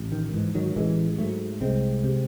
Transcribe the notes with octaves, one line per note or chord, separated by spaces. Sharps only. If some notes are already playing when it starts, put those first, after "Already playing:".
Already playing: A1
D#3
G#2 E3
D#3 F#3
A1 E3 G#3
G#2 F#3 A3
C2 G#3 C4
C3